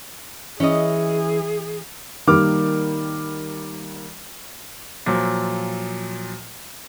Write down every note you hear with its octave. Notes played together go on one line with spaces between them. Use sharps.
E3 C#4 G#4 D#5
D#3 G3 A#3 D6 F6
A#2 F3 F#3